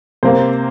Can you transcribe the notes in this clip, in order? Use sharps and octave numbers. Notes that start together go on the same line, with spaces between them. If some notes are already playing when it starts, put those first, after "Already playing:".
C3 A#3 C5